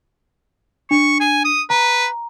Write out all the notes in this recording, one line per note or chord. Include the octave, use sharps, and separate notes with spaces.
D4 C#6
G#5
D#6
B4 A#5